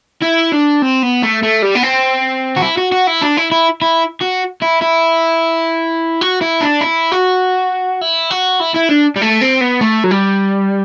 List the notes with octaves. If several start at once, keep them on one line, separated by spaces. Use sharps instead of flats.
E4
D4
C4
B3
A3
A3
G3
B3
C4
F#4
E4
F#4
F#4
E4
D4
E4
E4
E4
F#4
E4
E4
F#4
E4
D4
E4
F#4
E4
F#4
E4
E4
D4
G3
A3
C4
B3
A3
F#3
G3